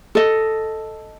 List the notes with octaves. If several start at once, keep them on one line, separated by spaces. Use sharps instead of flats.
A4 D#5